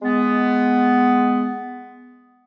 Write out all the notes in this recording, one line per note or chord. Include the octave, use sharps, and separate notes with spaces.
G#3 B3